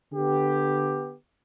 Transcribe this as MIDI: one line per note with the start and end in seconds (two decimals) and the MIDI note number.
0.12 1.14 50
0.12 1.14 59
0.12 1.14 67